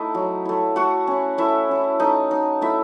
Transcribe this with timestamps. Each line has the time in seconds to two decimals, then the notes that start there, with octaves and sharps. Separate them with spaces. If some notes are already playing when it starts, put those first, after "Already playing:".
Already playing: A3 D#4 E4 D#5
0.15 F#3
0.45 A3 E4
0.76 A3 F#4 F#5
1.07 C#4 E4
1.38 A3 E4 E5
1.69 C#4 E4
2.00 A3 D#4 D#5
2.31 D#4
2.61 A3 E4 E5